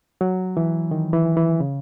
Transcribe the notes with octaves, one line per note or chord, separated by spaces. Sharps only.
F#3
E3
D#3
E3
E3
C#3